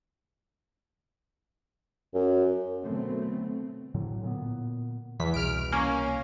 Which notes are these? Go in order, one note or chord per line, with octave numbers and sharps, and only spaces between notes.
F#2
B2 D3 F#3 A3 B3 C4
A2 D3 F#3
A#2 B3
E2 E3 B6
C2 B2 F6 D7
A#3 C#4